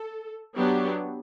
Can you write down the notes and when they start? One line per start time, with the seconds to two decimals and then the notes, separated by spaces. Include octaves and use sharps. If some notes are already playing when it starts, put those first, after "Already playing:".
Already playing: A4
0.55 F#3 B3 D4 G4